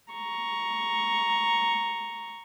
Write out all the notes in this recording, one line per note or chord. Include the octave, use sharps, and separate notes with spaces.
A#5 C#6